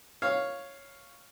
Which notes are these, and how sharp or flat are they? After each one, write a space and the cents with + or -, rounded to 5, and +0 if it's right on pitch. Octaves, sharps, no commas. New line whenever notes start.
C#5 +0 F5 +0